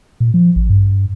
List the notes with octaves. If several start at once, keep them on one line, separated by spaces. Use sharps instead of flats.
A#2
F3
A1
G2